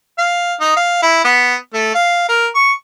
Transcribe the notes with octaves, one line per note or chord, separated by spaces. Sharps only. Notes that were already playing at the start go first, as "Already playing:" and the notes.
F5
D#4
F5
E4
B3
A3
F5
A#4
C#6